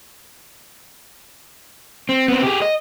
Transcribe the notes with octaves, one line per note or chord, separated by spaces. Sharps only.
C4
B3 C4
G4 G#4
D#5